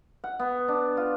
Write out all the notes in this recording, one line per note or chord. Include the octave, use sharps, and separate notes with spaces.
F#5
B3
D4
F4